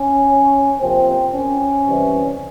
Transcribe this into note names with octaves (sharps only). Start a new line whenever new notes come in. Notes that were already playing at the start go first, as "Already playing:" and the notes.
Already playing: C#4
C3 F3 A#3 C4
C#4
C3 E3 G3